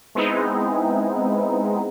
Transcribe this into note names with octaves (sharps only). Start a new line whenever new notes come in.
G#3 B3 C4 D#4 E4